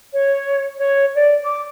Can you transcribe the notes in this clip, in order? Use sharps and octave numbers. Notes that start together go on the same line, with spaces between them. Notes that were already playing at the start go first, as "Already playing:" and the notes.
C#5
C#5
D5
D6